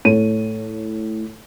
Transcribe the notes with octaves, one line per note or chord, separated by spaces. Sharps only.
A2 A4 C#5 D#7